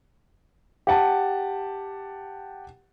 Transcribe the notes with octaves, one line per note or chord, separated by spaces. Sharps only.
G4 F#5 A5